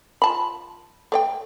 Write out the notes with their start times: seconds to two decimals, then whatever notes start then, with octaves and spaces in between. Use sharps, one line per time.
0.22 F4 A5 B5
1.12 A3 D5 G5